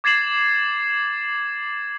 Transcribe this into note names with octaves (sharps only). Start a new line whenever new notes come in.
D6 G#6 A6 C7 E7 F#7